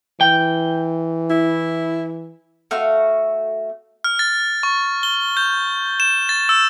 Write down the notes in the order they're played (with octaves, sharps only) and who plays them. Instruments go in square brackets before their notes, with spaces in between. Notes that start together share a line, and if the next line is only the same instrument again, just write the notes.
[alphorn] E3 [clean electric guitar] G5
[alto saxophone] E4
[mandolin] A3 F#4 F5 C#6
[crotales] F6
A6
C#6
G7
G6
E7
A6
E6